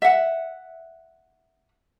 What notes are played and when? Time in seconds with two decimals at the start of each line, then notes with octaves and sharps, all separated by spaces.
0.02 E5 F#5